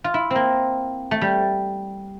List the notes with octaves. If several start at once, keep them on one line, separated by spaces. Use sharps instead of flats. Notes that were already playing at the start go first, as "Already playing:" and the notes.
F4
E4
A#3 C4
A3
G3